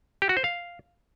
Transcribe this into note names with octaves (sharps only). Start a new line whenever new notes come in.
G4
F#4
C5
F5